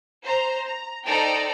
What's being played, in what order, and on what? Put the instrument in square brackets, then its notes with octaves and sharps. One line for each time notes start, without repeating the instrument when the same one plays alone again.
[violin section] C5 A#5
A#5
D#4 A4 C5 D5 G5 A#5